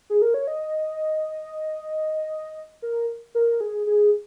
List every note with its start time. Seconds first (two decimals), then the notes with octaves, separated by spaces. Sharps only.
0.10 G#4
0.22 A#4
0.34 C#5
0.47 D#5
2.82 A#4
3.35 A#4
3.61 G#4
3.87 G#4